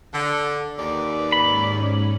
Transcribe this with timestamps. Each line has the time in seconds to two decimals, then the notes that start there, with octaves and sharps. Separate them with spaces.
0.14 D3
0.79 D#2 B4 D5
1.32 G#2 C#4 B5